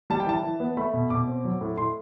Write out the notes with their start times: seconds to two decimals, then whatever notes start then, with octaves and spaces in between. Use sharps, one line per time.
0.10 G3 A5
0.20 G5
0.26 E3 A5
0.43 E3
0.60 B3
0.77 A3 B5
0.94 B2
1.10 B2 D6
1.27 C4
1.44 F#3
1.61 A2
1.77 A2 C6